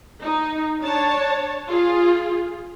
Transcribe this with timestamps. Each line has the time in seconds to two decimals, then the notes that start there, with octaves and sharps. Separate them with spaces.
0.23 D#4
0.81 D4 C#5 A5
1.69 F4 G#4